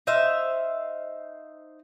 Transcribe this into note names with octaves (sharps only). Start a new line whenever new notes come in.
D#4 C5 E5 F5